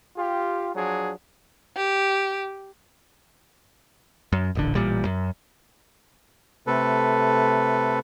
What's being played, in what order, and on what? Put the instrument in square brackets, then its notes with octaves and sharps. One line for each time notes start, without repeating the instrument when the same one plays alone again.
[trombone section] F4 G4
F3 F#3 D4 G#4
[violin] G4
[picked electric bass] F#2
D#1 A1 D3
A1 A#2 G3
F#2
[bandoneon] C3 A3 A4 B4